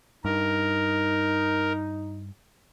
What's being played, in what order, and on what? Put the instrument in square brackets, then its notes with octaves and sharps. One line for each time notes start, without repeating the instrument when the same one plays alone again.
[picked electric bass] G2 [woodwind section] D#4 [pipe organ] A#4